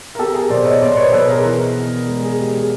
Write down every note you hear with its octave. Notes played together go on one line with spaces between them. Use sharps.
A#4
B3 G4 A4
G#4 A#4
B2 C5 D5
C#5 D#5
B2 C5 D5
C5
B4 C#5
B2 A4 B4
G#4 A#4
E3
B3
G#3
G#4
G#3 G4
G#4